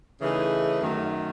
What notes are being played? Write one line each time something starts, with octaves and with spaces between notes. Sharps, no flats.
C#3 E3 A3 D#4 G#4
F#2 D#3 A3